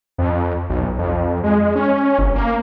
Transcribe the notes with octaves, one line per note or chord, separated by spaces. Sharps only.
F2
B1
F2
G#3
C#4
G1
A#3